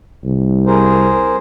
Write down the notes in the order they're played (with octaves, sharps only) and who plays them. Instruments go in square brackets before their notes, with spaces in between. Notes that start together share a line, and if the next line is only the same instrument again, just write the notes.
[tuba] C2
[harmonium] G#4 A#4 C5